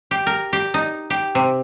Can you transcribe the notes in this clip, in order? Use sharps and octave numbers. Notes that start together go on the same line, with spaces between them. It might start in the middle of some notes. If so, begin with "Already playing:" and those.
G4
A#4
G4
D#4
G4
C3